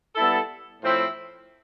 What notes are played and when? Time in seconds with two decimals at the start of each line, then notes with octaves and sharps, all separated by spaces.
0.15 G3 B3 E4 A4
0.82 A2 F3 C4 E4